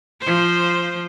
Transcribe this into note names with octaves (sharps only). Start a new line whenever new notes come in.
F3 C5